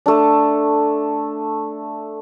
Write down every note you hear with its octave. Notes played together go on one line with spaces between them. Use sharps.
A3 D4